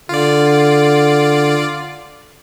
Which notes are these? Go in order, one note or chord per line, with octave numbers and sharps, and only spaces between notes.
D3 F4 D5